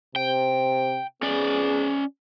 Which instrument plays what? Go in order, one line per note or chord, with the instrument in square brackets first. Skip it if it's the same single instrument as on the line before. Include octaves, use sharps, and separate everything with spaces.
[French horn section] C3 C5 [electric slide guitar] G5
[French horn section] F2 B3 G#4 [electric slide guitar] C#4 D5